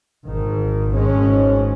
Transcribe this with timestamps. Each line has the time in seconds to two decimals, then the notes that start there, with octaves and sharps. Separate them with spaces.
0.25 G#1 G#2 D#3
0.91 G#1 G#2 G#3 C#4